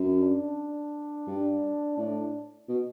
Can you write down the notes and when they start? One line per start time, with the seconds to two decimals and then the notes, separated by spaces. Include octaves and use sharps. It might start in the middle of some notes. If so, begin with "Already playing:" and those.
Already playing: F#2
0.21 D4
1.27 G2
1.97 A2 D4
2.69 B2